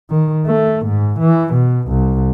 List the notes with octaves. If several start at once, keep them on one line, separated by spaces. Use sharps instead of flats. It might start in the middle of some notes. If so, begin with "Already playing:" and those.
D#3
A3
G#2
E3
B2
C2